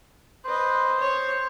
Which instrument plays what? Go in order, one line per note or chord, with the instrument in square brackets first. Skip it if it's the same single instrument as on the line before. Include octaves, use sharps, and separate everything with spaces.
[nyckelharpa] B4 D#5 [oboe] C5
[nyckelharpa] C#5